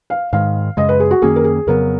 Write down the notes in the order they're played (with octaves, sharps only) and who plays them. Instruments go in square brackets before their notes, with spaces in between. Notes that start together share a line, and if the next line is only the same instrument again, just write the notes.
[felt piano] F5
[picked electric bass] G#2 D#3 G#3 [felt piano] F5
[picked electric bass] F#2 C#3 G#3 [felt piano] D#5
[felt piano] B4
G#4
F#4
[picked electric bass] F#2 D#3 A#3 C#4 [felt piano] G#4
[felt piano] A#4
G#4
[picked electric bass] F2 C#3 F#3 B3 [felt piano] A#4